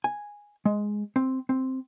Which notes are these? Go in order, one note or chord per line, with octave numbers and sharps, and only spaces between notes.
G#5
G#3
C4
C4